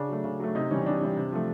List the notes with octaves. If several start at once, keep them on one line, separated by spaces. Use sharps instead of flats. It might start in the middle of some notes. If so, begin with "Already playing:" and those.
Already playing: C#3 D4
F#3 A3
C#3
F#3 A3
C3 D#4
E3 G3 C#4
C3 D4
E3 G3
C3
F3 A3